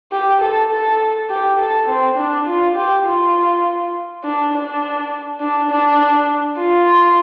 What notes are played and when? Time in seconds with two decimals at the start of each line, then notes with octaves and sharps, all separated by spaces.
0.12 G4
0.41 A4
0.71 A4
1.29 G4
1.59 A4
1.88 C4
2.17 D4
2.47 F4
2.76 G4
3.05 F4
4.24 D4
4.53 D4
5.40 D4
5.70 D4
6.58 F4